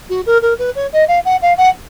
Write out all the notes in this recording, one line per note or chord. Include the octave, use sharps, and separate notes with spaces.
F#4
A#4
A#4
B4
C#5
D#5
F5
F#5
F5
F#5